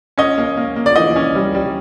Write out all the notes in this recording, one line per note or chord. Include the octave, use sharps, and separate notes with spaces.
C#4 D#5
A#3
A#3
A#3
D5
E3 D#5
C#4
G3
G3